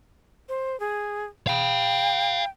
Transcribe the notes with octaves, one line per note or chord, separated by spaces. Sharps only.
C5
G#4
F5 G5 B5